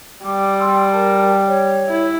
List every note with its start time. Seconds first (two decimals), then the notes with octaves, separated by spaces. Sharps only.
0.25 G3 D6
0.59 C6 E6
0.92 A#4 A5
1.48 C#5
1.88 E4